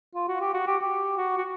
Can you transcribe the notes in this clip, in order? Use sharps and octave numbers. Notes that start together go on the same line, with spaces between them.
F4
F#4
G4
F#4
G4
G4
F#4
F#4